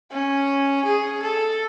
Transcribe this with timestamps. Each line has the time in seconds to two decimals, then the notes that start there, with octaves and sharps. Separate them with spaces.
0.11 C#4
0.85 G#4
1.23 A4